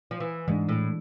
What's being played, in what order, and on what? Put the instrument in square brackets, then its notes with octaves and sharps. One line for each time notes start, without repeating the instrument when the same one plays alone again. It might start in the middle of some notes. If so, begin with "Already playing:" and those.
[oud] F3
E3
[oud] G#2 [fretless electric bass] E3 G#3 D4
[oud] A2